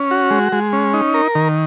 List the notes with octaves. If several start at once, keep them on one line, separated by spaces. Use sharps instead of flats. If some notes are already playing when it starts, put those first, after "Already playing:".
Already playing: C#4
F#4
G#3
G#3
C#4
D#4
A#4
D#3